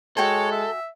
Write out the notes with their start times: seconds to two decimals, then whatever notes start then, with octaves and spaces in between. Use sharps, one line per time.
0.17 G#3 F#4 A4 C#5 G5 G#5
0.52 E5